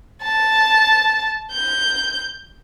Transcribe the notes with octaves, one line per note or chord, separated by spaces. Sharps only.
A5
G6